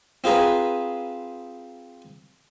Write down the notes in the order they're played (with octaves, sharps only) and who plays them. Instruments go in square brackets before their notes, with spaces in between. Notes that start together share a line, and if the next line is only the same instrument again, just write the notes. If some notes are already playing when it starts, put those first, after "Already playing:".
[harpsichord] C4 F4 G#4 B4 A#5